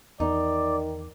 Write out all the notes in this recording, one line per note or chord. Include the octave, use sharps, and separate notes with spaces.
E2 D#3 D#4 D5